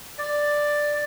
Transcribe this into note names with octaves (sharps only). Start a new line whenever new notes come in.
D5